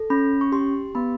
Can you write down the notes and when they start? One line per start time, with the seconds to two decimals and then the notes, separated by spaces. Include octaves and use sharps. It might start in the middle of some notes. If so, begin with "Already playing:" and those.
Already playing: A4
0.10 C#4 B5
0.41 C#6
0.52 G4 C6
0.95 B3 B5